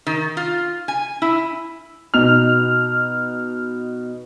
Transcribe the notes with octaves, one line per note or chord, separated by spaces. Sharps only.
D#3
F4
G#5
E4
B2 D#4 F6 F7